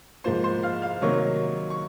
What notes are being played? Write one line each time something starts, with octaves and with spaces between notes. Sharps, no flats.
G#2 F3 A#3 C5 C6
C5 C6
F5 F6
F5 F6
C3 D#3 F#3 A#3 C#5 C#6
C#6